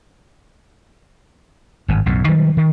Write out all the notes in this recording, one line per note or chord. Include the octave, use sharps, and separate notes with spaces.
G#1 G2
B1 F#2 A2
D#3 F#3 G3
D#3